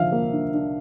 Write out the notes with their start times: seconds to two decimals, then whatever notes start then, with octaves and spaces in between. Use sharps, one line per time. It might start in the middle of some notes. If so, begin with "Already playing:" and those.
Already playing: D3 F3 E5 F5
0.12 A#3
0.32 D4
0.54 D4